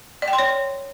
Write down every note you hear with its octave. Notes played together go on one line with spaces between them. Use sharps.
D5
G5
C6
C#5